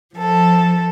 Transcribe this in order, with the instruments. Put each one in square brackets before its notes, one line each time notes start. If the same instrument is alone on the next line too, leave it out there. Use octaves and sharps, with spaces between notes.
[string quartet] F3 A4